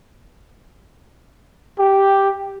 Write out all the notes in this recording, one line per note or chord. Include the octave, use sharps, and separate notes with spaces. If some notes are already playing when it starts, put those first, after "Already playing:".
G4